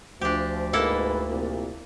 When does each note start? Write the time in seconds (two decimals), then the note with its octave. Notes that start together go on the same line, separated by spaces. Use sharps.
0.21 D2 F3 D4 G4
0.73 G#2 B2 A#3 E4 A4 B4
1.29 C2 A#2